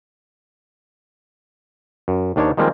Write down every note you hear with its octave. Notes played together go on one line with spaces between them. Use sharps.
F#2
D#2 D#3 D4 C5 C#5
D#3 F3 G3 G#3 A#3 C4